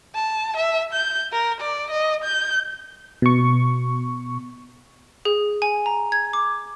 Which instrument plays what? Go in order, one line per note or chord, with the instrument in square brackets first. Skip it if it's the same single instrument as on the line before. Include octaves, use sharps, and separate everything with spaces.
[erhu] A5
E5
G6
A#4
D5
D#5
G6
[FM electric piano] B2 C#6
[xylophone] G#4
G#5
A#5
G#6
D6